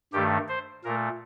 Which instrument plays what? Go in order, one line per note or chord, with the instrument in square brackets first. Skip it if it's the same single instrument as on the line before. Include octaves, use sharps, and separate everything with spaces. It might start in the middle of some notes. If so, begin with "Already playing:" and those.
[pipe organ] G2 D#3 A3 G4
C5
A#2 A3 A#4